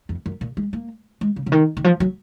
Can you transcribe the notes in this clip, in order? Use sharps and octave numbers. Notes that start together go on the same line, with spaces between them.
F2
F#2
A#2
G#3
A#3
G#3
C#3
C#3
D#3
D#3
F3
F#3